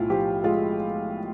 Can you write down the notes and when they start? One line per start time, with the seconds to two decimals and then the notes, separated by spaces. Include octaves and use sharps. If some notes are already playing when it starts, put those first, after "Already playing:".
Already playing: B1 A2 E4 F4
0.10 F3 G4
0.44 G#3 F4